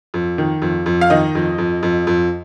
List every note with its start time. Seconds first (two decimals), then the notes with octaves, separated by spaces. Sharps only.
0.14 F2
0.38 D#3
0.62 F2
0.86 F2
1.01 F5
1.10 D#3 D#5
1.35 F2
1.58 F2
1.83 F2
2.07 F2